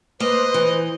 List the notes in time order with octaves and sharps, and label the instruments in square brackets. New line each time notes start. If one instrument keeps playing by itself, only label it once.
[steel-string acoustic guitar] A#3 [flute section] B4 C5 [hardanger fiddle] D#5
[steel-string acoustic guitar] E3